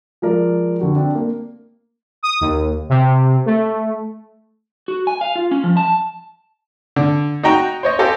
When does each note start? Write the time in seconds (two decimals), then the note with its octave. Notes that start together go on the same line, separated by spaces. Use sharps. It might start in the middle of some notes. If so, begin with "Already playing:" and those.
0.22 F3 G#3 A#4 D5
0.80 D3 F#4 G4
0.96 C4 D4
1.15 A#3
2.23 D#6
2.41 D#2
2.89 C3
3.46 A3
4.88 F#4
5.07 G#5
5.21 F5
5.36 F4
5.51 C#4
5.64 F3
5.77 A5
6.96 D3
7.43 D#4 F#4 D#5 G5 A#5
7.83 C5 C#5 D#5
7.99 G4 A4 C5 D#5 F5 G#5